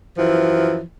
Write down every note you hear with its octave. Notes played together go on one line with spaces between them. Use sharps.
F#2 E3 F3